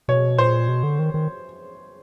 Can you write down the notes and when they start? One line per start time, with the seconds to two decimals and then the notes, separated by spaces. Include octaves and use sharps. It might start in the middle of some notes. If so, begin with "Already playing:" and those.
0.08 B2 C#5
0.38 A#2 C5
0.68 B2
0.83 D3
0.99 D#3
1.14 D#3